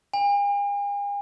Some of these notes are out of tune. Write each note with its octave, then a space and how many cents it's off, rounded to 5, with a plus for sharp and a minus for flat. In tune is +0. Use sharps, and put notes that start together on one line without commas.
G#5 -45